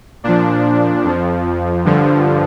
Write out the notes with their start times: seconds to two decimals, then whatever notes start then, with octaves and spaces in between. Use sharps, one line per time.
0.24 A#2 F3 D4
1.04 F2 F3
1.85 G2 D3 F3